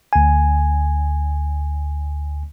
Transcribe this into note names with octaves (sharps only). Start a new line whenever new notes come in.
D2 G#5